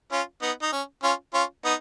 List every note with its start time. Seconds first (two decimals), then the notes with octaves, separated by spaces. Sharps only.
0.12 C#4 F4
0.42 B3 D#4
0.62 D#4
0.72 C#4
1.03 C#4 F4
1.34 C#4 F4
1.64 B3 D#4